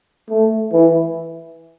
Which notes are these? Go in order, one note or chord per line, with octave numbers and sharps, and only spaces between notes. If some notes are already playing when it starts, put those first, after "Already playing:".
A3
E3